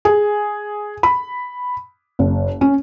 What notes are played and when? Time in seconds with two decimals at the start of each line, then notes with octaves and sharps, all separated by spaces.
0.05 G#4
1.03 B5
2.19 F#1
2.61 C#4